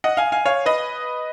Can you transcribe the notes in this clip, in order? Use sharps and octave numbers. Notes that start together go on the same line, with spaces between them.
D#5 F#5
F5 G#5
F5 G#5
C#5 F5
B4 D#5